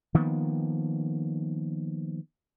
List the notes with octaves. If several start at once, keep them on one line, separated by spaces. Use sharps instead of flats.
D#3 F3 A#3 B3